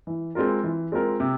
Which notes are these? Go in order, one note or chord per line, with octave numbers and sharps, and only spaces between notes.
E3
G#3 C4 F4 A#4
E3
G#3 C4 F4 A#4
C3